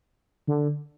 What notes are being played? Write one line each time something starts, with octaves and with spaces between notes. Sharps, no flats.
D3